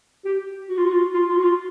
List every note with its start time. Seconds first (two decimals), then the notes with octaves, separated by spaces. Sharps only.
0.25 G4
0.69 F#4
0.77 F4
0.84 F#4
0.92 F4
1.14 F4
1.28 F4
1.36 F#4
1.43 F4